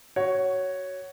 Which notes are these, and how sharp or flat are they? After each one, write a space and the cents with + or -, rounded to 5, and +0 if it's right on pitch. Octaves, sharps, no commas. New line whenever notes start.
F#4 +15 C#5 +0